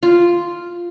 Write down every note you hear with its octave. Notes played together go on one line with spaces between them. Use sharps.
F4